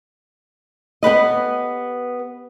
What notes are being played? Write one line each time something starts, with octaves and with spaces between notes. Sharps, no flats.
B3 G4 B4 D#5